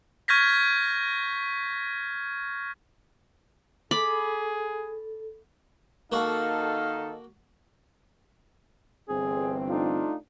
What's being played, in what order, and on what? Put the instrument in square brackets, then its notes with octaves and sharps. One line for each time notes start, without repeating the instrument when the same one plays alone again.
[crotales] C#6 F6 G6 G#6 A#6 B6
[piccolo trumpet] G#4 [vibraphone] A4 [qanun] B5 [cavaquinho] D6
[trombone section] D#3 D#4 A4 [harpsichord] A#3 F#4 [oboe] F5
[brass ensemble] G1 E3 C4 [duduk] G#4
[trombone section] A3 D4 F4 [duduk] D#4